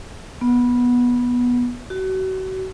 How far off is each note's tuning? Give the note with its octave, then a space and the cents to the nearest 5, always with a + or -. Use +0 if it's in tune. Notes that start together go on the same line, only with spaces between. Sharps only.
B3 -15
F#4 +35